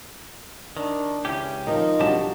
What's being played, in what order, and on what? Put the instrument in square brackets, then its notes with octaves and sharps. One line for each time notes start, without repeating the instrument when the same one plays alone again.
[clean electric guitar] D#3 [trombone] D4
[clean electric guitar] C#2 C#4 G4 [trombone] E4
[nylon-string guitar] D#3 [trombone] F3 [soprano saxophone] D#4
[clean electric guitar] B1 G4 A5 [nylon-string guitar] G3 D4 F#4